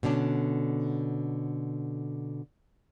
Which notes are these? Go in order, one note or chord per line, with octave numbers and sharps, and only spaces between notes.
B2 D3 C#4 D4